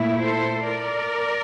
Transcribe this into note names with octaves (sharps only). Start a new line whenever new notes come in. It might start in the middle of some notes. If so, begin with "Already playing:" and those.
Already playing: A#2 A3 E4
A4 C5
A#4 D5